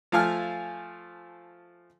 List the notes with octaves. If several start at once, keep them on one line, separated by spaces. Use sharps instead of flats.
F3 A3 F5 G#5 A5 F6